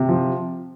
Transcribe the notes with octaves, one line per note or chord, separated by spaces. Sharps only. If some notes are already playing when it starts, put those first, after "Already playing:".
Already playing: C3
F3